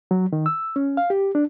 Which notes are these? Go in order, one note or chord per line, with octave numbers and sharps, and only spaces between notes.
F#3
D#3
E6
C#4
F5
G4
D4